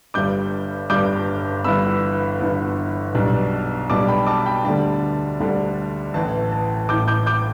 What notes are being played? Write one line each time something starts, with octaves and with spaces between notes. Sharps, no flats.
G1 G2 G3 D4 D6 G6
G1 G2 G3 D4 D6 G6
G1 G2 E3 B3 B5 E6
G1 G2 E3 B3
B1 B2 G3 D4
B1 B2 G3 D4 A5 D6
G5 B5
A5 D6
G5 B5
D2 D3 G3 D4 A5
D2 D3 G3 D4
A1 A2 E3 A5
A5
A1 A2 E3 D6 G6
D6 G6
D6 G6